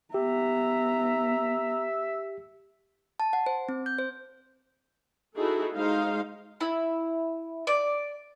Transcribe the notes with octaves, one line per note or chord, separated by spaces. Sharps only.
B3 G4 E5 A#5
A5
F#5
C5
C4
G6
C5
D#4 E4 F#4 G#4 A4
G#3 D#4 C5 F5
E4
D5